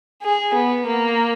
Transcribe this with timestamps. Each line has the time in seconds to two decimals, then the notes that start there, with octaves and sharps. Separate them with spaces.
0.22 G#4
0.53 B3
0.87 A#3